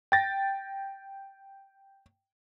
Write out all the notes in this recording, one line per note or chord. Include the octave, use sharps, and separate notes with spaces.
G5 A6 A#6